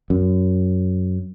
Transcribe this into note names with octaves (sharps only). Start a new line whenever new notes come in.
F#2